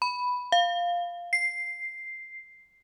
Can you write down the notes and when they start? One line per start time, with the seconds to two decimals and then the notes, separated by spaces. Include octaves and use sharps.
0.02 B5
0.52 F5
1.33 C7